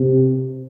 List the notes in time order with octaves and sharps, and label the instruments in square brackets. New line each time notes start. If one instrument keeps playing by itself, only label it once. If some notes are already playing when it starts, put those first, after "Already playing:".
Already playing: [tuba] C3